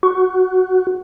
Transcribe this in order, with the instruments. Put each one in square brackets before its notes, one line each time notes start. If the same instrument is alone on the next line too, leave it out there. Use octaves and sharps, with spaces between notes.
[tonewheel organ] F#4